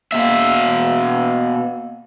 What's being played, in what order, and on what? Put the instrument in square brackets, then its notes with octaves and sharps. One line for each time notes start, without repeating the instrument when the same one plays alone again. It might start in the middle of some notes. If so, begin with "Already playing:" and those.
[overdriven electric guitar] B2 E5 [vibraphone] A#3 F5